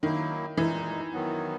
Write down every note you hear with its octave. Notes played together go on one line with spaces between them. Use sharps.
D#3 F#3 A#3 E4
A#2 E3 G#3 D#4
D#3 F#3 B3